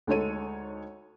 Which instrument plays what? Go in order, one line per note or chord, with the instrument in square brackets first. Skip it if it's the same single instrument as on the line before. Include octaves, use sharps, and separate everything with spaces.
[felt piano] D2 G#3 D#4 A4 C#5 D#7